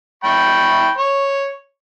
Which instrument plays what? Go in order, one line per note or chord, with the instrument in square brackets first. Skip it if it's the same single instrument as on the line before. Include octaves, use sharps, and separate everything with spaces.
[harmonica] G5 B5 C#6
C#5